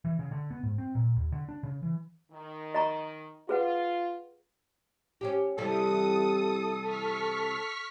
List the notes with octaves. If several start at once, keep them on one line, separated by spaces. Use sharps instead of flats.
E3
C#3
D3
B3
G#2
C4
A#2
D#2
D3
D4
C#3
E3
D#3
D#5 A#5 C#6
F4 G#4 B4 F#5
C#4 D4 G4
C3 E3 G3 A4 D#6
C#6 F6 B6